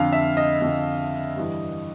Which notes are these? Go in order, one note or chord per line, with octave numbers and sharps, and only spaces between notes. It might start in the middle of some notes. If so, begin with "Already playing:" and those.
Already playing: F2 D3 F5
E5
D#5
F2 D3
G2 E3